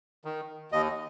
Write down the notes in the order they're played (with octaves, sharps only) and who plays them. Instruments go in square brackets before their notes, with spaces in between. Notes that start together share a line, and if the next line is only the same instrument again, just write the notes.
[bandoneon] D#3
D#2 D#5